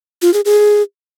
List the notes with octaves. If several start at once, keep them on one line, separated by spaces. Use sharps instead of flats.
F4
G#4
G#4